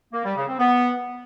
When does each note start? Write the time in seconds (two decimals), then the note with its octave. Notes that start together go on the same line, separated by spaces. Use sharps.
0.13 A#3
0.24 G3
0.36 C#3
0.48 C4
0.59 B3